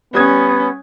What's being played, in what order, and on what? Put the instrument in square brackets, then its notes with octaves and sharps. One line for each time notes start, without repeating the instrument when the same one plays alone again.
[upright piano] G3 D#6 G#6 [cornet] B3 [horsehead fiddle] C#4